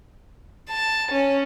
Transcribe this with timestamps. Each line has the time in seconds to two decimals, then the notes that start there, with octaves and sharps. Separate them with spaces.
0.70 A5
1.12 C#4